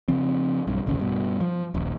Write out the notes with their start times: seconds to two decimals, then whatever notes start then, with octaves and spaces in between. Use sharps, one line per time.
0.08 C#3 F3 C4
0.67 B1 G2
0.86 E1 A1 D#2 C#3
1.00 G2 B2
1.41 F3
1.74 D#1 A#1